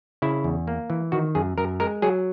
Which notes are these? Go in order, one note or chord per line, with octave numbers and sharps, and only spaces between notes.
C#3 E4
E2
A#3
E3
D#3 F#4
F#2 G#4
F#2 A#4
G#3 A#4
F#3 G#4